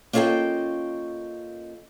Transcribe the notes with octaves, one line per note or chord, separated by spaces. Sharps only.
A#3 C#4 F4 A4 D#5 G5